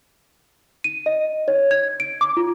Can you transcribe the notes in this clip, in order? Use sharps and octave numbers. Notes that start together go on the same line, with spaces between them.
D#7
D#5
C#5
G#6
D7
D6
F4